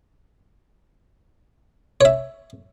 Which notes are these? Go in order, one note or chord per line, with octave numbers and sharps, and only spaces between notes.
C#5 E5